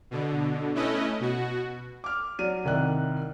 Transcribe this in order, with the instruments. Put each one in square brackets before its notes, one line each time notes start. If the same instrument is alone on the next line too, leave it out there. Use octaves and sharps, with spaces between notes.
[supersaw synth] B2 D3
A3 C#4 E4 B4 D#5
B2 F#4
[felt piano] D6 F6
F#3 D5 F6 D#7
C2 D#3 D5 E5 F#6